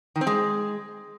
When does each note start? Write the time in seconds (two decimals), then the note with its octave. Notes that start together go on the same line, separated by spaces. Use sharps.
0.16 D#3
0.21 C4
0.27 G#3